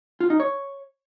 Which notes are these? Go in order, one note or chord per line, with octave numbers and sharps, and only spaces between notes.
F4
D#4
C#5